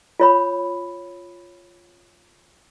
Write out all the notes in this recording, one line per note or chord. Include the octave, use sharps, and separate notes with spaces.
F4 C#5 B5